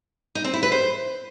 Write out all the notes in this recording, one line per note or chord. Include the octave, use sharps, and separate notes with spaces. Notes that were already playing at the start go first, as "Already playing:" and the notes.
D#4
C4
E4
B4
C5